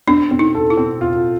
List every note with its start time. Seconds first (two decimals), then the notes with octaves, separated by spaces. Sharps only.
0.07 C4 D4
0.31 C4
0.39 D#4
0.55 A4
0.70 E4
0.77 C4
1.01 F4